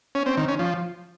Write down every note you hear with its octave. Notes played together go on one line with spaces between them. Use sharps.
C#4
C4
D#3
C#4
F3